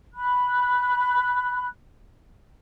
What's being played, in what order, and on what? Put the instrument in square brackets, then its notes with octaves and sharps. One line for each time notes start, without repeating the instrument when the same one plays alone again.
[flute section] B5 F#6